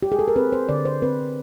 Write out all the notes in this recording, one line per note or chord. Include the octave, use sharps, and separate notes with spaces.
G4
G#4
A4
A#4
C4 B4
C5
D3 D5
C5
C4 B4